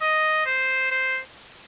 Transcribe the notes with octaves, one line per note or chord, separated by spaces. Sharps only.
D#5
C5
C5